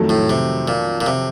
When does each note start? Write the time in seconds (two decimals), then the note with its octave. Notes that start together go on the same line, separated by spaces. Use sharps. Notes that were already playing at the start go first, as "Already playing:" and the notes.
Already playing: F2 D#3 F#3 A3
0.09 A2
0.30 C3
0.68 A#2
1.01 A#2
1.06 C3